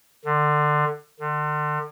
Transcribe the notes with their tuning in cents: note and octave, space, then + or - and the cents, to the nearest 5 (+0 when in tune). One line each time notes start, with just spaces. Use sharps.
D3 +25
D3 +40